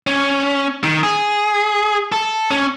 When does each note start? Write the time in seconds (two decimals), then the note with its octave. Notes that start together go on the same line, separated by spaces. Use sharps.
0.07 C#4
0.84 D#3
1.03 G#4
2.12 A4
2.50 C#4